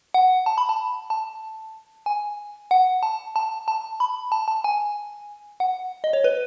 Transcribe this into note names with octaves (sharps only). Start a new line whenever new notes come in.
F#5
A5
B5
A5
A5
G#5
F#5
A5
A5
A5
B5
A5
A5
G#5
F#5
D#5
C#5
B4